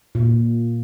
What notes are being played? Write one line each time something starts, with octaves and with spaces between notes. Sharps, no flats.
A#2